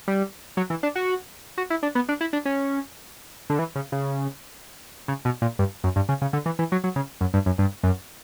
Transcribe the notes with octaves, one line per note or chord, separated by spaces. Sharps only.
G3
F#3
E3
D4
F#4
F#4
E4
D4
B3
D4
E4
D4
C#4
D3
E3
C#3
C#3
C#3
B2
A#2
G2
F#2
G2
C#3
C#3
D3
E3
E3
F#3
F#3
C#3
F#2
G2
F#2
G2
F#2